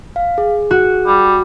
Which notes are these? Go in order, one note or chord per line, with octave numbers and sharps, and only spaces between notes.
F5
G#4
F#4
G3